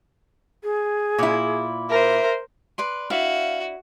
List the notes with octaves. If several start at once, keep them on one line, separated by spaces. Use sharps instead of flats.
G#4
A#2 E4
A#4 C5 E5
B4 D5 C6
D4 E4 F#4 E5 F5